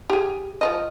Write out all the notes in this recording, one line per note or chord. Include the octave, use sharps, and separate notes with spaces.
G4 G#4
F3 A#4 D#5